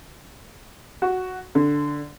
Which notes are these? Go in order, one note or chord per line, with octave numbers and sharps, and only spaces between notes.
F#4
D3